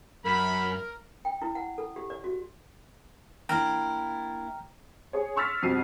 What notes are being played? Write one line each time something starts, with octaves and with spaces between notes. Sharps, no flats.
F#2 A#4 B5
G5
E4
F#5
A4
G4
D5
F#4
A#3 D4 E4 G5 A#5 F6
G#4 C#5
C6 C#6 E6 F6 A6 B6
F2 B2 G3 C7 D#7